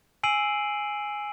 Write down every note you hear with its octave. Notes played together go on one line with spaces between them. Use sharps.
G#5 E6 C7 D7 D#7 F#7